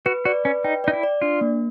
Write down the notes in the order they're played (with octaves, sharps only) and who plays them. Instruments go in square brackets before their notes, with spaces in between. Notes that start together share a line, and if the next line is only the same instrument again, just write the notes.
[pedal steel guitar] F#4 [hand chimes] B4
[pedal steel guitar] F#4 [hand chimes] D5
[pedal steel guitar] C#4 [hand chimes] B4
[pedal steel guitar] D#4 [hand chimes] G5
[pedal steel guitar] D#4 [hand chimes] D5
[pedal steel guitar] E4
[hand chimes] D5
[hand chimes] D4 [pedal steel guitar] F4
[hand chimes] A#3